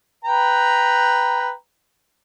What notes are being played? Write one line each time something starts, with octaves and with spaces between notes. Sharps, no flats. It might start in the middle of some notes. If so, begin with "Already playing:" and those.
B4 G5 A#5